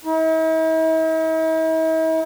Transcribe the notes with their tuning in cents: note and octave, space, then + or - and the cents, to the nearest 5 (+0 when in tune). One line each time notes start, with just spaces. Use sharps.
E4 -45